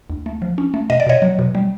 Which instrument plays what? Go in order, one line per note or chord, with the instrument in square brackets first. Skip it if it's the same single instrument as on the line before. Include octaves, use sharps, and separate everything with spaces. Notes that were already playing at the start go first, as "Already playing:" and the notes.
[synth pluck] D2
A3
F3
C#4
A3
B2 D#5
D5
B2 C#5 D#5
F#3
B2
G3